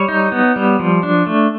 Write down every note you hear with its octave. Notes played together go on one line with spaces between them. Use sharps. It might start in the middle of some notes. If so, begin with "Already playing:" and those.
Already playing: G3 C#5
D#4
B3
G3
F3
D4
A3